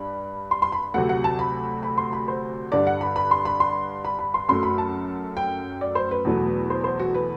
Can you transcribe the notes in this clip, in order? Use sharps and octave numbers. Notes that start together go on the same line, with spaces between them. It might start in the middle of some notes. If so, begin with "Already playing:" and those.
Already playing: G2 G3 B5
C6
C6
B5
D2 C3 F#3 A3 F#5
F#5
A5
B5
B5
C6
B5
C5
G2 D3 G3 D5
F#5
B5
B5
C6
B5
C6
B5
B5
C6
F#2 F#3 A3 C6
B5
A5
G5
D5
C5
B4
E2 B2 F#3 A3
C5
C5
F#4
B4